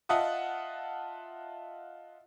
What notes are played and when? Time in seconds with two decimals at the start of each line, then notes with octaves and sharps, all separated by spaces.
0.09 F4 D#5 E5 F#5 A5 D#6